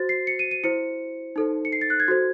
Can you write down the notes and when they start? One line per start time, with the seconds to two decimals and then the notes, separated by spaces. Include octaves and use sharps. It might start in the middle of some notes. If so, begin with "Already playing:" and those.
Already playing: F#4 C5 A6
0.09 C7
0.27 C#7
0.39 D#7
0.51 D#7
0.64 E4 C5 C#7
1.36 D#4 A4 C5
1.65 C#7
1.72 C7
1.81 A6
1.90 F#6
2.00 G#6
2.08 F#4 A4 C5